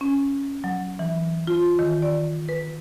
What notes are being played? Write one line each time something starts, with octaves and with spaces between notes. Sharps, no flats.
C#4
F#3
E3
F4
D#3
D5
B4